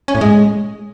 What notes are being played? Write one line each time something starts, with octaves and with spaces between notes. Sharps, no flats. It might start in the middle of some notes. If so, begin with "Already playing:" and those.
C#4
A2
G#3